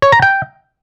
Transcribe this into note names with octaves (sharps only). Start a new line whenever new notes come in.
C#5
A#5
G5